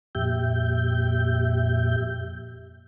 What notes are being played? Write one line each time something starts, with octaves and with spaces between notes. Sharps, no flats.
F2 A#2 G4 E5 G6